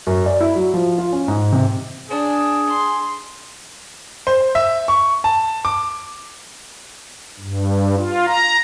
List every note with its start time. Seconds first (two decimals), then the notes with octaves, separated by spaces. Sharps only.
0.07 F#2
0.26 D5
0.41 E4
0.55 F#3
0.74 F3
0.98 F4
1.12 C#4
1.28 G#2
1.53 C3
2.10 D4 G#4
2.70 C6
4.27 C5
4.55 E5
4.88 C#6
5.24 A5
5.65 D6
7.40 G2
7.97 F4
8.26 A#5